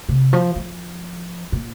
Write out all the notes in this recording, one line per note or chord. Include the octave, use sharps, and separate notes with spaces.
C3
F3
F3
A#2